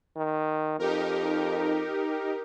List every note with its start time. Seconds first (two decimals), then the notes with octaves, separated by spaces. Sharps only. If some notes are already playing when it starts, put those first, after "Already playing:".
0.17 D#3
0.79 F2 D#4 G4 A#4